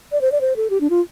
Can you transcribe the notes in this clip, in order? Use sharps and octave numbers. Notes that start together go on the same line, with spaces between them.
D5
C5
D5
C5
A4
G4
D4
F4